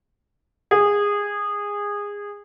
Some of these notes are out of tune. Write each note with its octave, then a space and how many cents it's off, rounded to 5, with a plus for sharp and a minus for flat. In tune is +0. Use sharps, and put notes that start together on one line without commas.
G#4 -20